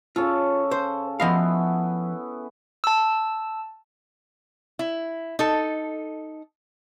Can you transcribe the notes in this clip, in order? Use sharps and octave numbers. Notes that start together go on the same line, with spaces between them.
C#3 C#4 F4 A4
C5
F3 B3 E4 D#5 F5
A5 E6
E4
D#4 A4